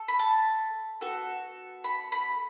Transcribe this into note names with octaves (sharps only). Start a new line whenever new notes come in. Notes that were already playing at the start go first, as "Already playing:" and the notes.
Already playing: A4
B5
A5
B3 F#4 A4
B5
B5